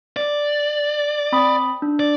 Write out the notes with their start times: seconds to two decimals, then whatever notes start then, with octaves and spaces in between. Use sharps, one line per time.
0.16 D5
1.32 C4 B5 D#6
1.82 D4
2.00 D5